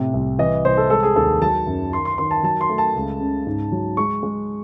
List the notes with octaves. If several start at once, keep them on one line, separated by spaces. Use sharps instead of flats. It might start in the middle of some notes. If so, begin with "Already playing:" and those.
Already playing: A2 C3
C2
E3 D#5
C2 C5
A4
G#3 A4
G#4
D#2 A4
F#3 A5
F#2
D#3 C6
C6
D#3 C6
A5
F#3 A5
C6
A3
A5
C#2
C#3
G#2
F#3
G#3 C#6
G#3